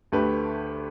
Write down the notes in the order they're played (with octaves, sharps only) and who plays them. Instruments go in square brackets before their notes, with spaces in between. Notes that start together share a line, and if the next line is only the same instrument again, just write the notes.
[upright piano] D2 D3 A3 G4 B4